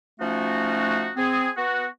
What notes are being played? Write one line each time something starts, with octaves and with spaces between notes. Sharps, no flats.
F3 A3 C#4 D#4 F#4
C4 G#4
B3 F#4